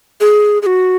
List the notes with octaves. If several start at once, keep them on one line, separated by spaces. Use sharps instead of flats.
G#4
G#4
F#4